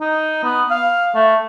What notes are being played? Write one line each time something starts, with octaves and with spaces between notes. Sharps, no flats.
D#4
B3
F5
A3